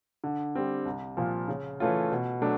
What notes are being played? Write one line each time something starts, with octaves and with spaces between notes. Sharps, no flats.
D3
G3 C4
C2
A#2 F3
C#3
E3 A3 C#4 F4
B2
F#3 A3 D4